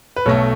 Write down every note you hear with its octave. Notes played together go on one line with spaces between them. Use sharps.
B4
B1 B2 A3 A4 C#5